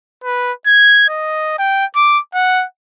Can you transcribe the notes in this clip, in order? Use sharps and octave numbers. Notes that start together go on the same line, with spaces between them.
B4
G#6
D#5
G5
D6
F#5